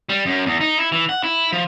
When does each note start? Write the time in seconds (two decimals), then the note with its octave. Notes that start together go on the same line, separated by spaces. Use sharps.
0.09 G3
0.26 F#2
0.46 E2
0.61 D#4
0.78 E4
0.92 E3
1.09 F#5
1.24 E4
1.52 F3